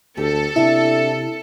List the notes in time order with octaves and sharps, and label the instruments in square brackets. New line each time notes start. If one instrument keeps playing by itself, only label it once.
[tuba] D2 [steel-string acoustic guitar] G4 [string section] A4
[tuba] C3 [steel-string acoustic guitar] D4 E5 [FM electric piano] E4